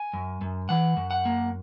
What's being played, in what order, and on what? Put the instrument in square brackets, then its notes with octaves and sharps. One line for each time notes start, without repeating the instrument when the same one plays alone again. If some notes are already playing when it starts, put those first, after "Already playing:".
Already playing: [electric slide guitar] G#5
F#2
F#2
E3 F#5
F#2
F#5
A#3